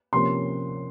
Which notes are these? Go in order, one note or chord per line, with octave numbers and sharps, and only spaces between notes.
C3 F3 A#3 C#4 C6